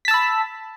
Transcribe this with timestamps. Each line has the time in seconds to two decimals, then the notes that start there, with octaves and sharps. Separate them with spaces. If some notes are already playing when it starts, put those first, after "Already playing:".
0.05 B6
0.08 A5
0.11 E6
0.14 B5